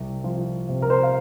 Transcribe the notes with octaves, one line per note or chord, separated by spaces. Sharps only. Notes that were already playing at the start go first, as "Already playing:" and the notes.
Already playing: C2
F3
C3
A#4
C5
F5